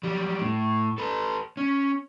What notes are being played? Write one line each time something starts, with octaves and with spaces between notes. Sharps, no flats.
F#3 G3
A2
A4 B4
C#4